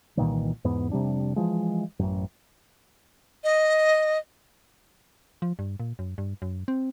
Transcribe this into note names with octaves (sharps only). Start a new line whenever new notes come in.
C2 A#2 D#3 E3
E2 G#2 B3
F1 C3 G3 D4
E3 F3 G#3
A1 F#2
D#5
F3
G2
A#2
F#2
G2
F#2
C4